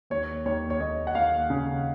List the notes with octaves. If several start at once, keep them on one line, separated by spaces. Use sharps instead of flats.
D#2 C#5
D#2 C#5
C#5
D#2 D#5
F#5
D#2 F5
C#3